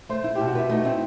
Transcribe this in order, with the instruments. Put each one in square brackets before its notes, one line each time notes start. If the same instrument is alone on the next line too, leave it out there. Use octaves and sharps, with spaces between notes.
[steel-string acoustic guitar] A3 [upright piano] C5
[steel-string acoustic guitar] E4
[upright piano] G4
[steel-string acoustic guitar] B2
[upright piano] F#4
[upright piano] E4 [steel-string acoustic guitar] B4
[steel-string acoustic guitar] A3 [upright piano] D#4
[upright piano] C4 [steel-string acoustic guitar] E4